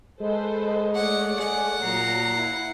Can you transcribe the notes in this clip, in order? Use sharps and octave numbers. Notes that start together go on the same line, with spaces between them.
G#3 A4 B4 C5
D#5
A3 C#5 D5 F#5
G#4 F#5
A#2 F#3 A#5 C7
E4